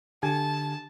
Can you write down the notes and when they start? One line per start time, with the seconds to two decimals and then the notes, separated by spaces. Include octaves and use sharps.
0.23 D3 G4 G#5 A5